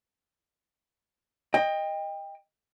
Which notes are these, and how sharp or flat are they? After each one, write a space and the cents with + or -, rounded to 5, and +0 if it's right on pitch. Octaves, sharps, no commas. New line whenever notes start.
D#5 +0 G5 +25